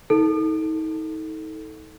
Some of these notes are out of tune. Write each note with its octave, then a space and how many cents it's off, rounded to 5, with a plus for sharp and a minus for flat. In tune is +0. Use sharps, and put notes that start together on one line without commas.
D#4 +35 A4 +0